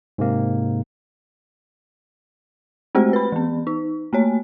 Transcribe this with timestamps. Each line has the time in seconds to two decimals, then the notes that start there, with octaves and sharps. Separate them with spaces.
0.18 G#2 C3 A#3
2.95 G#3 A3 C4 F#4 G4 C5
3.13 B4 B5
3.32 E3 B3
3.67 D#4
4.13 A3 A#3 C#5